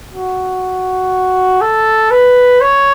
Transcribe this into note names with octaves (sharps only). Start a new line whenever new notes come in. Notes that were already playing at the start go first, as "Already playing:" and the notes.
F#4
A4
B4
C#5